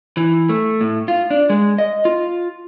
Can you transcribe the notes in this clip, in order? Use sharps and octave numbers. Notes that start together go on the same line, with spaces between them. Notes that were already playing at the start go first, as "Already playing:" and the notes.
E3
A3
A2
F4
D4
G#3
D#5
F4